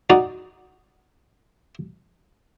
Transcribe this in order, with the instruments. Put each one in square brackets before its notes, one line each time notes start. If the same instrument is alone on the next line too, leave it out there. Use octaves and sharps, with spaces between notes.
[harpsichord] D#4 F#4 D5